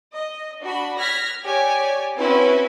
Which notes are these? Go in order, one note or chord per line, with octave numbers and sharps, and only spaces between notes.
D#5
D4 F#4 B5
F6 F#6 G#6 A#6 B6
G4 C#5 D5 G#5
C4 C#4 E4 F#4 B4